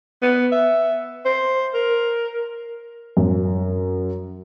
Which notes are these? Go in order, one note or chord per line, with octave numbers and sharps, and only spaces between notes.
B3
E5
C5
A#4
F#2